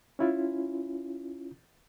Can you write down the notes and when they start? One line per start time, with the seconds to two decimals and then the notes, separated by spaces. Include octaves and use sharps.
0.19 C#4 E4 F4